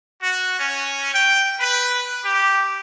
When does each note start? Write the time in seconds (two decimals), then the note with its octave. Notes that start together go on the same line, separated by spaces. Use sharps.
0.21 F#4
0.58 C#4
1.12 G5
1.60 B4
2.23 G4